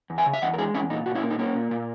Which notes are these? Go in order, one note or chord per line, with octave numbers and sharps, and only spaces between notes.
E2
E5 G#5
C#3
E5
E2 D#5 F#5
A#4
G#3 E4 G#4
E2 C#4 E4
A#2 D#4
A#2 F#4
C#4 E4
A#3
D#4
A#3 C#4
A#2
A#2